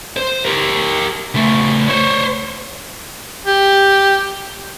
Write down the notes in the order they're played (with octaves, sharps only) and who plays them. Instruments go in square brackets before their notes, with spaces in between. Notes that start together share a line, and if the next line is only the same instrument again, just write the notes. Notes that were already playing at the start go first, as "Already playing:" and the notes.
[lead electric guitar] C5
G4 A#4
C#3 A3
C5 C#5
[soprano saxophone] G4